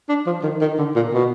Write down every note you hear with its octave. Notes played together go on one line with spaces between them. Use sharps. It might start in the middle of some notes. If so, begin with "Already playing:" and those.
D4
F3
D#3
D#3
D3
A#2
B2